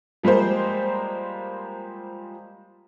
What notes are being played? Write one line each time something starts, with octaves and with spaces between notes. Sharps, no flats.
F3 G3 G#3 A#3 C5